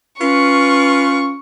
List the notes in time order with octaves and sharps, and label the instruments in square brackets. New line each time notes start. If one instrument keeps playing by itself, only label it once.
[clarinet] C#4 [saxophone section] F4 B4 [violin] C#6